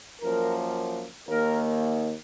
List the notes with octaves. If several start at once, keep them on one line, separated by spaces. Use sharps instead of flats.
F#2 F3 A#3 A#4
D#2 D#3 A#3 A#4